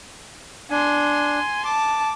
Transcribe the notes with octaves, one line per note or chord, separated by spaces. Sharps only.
D4 G#5 C6
A5 D6